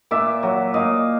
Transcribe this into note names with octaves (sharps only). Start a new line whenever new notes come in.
A#2 D5 E5
F#3
A#2 D#5 F5